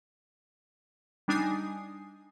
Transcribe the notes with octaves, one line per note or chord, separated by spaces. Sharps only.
G3 D4 D#4 G#5 D#6 C7